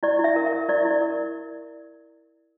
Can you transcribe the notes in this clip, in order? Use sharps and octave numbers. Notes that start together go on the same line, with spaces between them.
E4 D5
E4
E5
A#4
E5
A#4
E4 D5
E4
D5
A#4